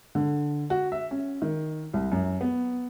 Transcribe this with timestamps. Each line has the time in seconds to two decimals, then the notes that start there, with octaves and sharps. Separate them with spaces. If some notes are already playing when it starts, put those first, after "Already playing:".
0.15 D3
0.70 F#4
0.92 E5
1.11 C#4
1.42 D#3
1.94 C2
2.12 F#2
2.41 B3